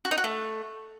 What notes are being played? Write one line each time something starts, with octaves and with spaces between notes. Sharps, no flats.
F#4
D#4
F#4
A3